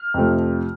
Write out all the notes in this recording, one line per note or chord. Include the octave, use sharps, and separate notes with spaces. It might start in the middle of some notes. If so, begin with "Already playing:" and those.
Already playing: F6
F2 C3 F3 A3